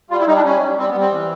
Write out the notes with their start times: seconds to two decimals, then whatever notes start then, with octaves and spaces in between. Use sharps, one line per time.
0.10 G3 F4
0.19 E4
0.27 G3 D#4
0.36 D4
0.44 G3 C#4
0.61 G3
0.78 G3 C4
0.89 B3
0.94 G3
1.00 C4
1.12 E3